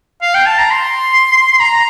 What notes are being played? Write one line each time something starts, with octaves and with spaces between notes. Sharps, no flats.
F5
G5
A5
A#5
C6
A#5